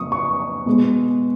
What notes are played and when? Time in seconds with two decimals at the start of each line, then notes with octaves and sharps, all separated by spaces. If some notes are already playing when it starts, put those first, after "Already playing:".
Already playing: F2 C#3 F#3 A#3 C#6 D#6
0.12 C#6
0.66 B2 G#3 B3